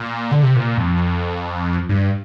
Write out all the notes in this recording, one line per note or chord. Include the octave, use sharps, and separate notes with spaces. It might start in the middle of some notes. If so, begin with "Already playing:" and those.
Already playing: A#2
D3
C3
A#2
F2
G2